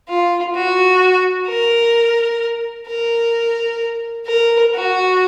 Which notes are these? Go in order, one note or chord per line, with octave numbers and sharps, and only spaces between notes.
F4
F#4
A#4
A#4
A#4
F#4